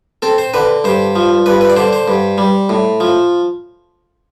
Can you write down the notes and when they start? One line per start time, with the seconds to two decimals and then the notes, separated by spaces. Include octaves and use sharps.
0.22 C4 A4
0.38 C5
0.54 D3 B4
0.84 G2 C5
1.16 F3
1.46 G2 B4
1.61 B4
1.70 D5
1.77 D3 C5
1.93 C5
2.08 G2
2.38 G3
2.69 A2
3.00 F3